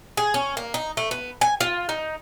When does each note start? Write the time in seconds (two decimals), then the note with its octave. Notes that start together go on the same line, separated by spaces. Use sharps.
0.17 G#4
0.34 C#4
0.57 A#3
0.74 D#4
0.97 A3
1.11 B3
1.41 G#5
1.60 F4
1.89 D#4